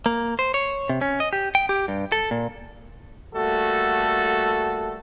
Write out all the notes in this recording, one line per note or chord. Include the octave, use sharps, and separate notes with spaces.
A#3
C5
C#5
C3
C#4
D#5
G4
G5
G4
G2
A4
A#2
G3 A3 A#3 F#4 A4